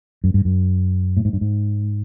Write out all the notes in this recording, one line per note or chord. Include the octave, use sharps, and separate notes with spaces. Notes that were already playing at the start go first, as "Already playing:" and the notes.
F#2
G2
F#2
A2
G#2
G2
G#2